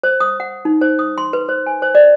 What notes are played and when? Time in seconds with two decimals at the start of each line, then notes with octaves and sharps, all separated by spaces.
0.03 C5
0.20 D#6
0.40 F#5
0.65 D#4
0.81 C5
0.99 D#6
1.18 C6
1.33 B4
1.49 C5
1.66 G#5
1.82 C5
1.95 D5